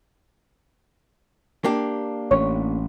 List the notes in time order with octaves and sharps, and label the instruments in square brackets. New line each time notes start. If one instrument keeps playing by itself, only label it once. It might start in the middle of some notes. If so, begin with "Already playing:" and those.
[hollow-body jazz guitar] A#3 D4 G4
[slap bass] A1 C#4 [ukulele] C#5